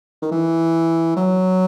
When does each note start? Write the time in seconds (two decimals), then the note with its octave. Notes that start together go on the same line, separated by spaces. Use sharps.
0.22 D#3
0.32 E3
1.17 F#3